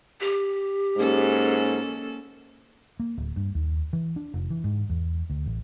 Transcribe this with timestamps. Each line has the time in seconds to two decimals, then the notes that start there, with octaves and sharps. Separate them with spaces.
0.21 G4
0.97 G#2 A#3 C#4 A4
3.00 A#3
3.17 D1
3.36 G2
3.55 D#2
3.93 E3
4.16 D4
4.34 F1
4.50 E3
4.64 G#2
4.89 E2
5.30 D2
5.46 A1